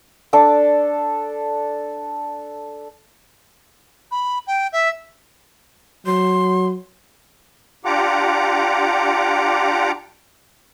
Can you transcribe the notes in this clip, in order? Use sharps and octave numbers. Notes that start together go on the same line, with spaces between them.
D4 A4 D6
B5
G5
E5
F#3 C6
D4 F4 G4 F#5 A#5 D6